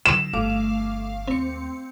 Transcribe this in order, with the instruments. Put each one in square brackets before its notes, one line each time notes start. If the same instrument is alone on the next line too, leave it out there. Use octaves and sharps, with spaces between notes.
[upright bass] D3 F#3 [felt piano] E7
[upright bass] G1 [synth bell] A3 F5 D6
[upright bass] D#2 [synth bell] C4 C#7